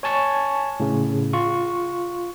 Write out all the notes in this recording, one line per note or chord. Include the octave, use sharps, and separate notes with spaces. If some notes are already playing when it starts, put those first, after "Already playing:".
C#5 G#5 A5 C#6
A2 C#3
F4 C#6